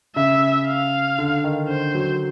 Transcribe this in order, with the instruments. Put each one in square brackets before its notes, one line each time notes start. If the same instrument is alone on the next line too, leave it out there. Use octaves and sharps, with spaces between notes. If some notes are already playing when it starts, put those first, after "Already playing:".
[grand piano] C#3 [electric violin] E5
[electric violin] F5
[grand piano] D3
D#3
[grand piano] D3 [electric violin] C5
[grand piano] F#3